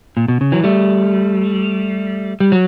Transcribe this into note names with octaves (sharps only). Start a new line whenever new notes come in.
A#2
B2
C#3
E3 F#3
G3 A3
G3
F#3